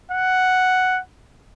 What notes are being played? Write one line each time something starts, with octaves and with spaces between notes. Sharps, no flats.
F#5